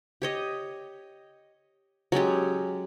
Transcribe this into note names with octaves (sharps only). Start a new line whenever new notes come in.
G4 C#5 D#5
F#3 G#3 C#4 G4